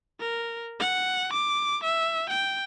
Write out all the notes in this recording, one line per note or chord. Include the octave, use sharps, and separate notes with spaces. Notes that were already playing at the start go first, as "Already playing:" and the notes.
A#4
F#5
D6
E5
G5